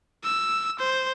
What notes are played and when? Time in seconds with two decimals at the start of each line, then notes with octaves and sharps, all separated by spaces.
0.24 E6
0.79 C5